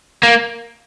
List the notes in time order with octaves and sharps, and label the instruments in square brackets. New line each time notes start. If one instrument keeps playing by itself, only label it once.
[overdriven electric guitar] A#3